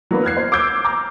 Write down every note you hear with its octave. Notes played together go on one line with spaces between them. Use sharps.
F#3 A#3 B3 D4
F6 F#6 G#6 C7
C5
D6 E6 F6 G6 G#6 D7
A#5 D6